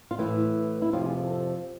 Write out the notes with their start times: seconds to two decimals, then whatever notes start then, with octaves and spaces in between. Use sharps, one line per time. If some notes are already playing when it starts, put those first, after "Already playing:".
0.11 F4
0.18 A2 E3 E4
0.82 E4
0.93 F2 C3 F3 F4
1.06 G#4
1.18 A4
1.30 A4